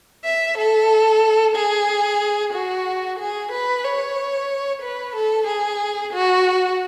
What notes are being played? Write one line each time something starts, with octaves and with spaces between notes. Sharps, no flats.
E5
A4
G#4
F#4
G#4
B4
C#5
B4
A4
G#4
F#4